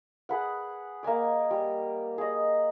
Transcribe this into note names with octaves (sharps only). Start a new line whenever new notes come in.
G#4 B4 F#5
A#3 D#5 G#5 D6
G3
G#4 D#5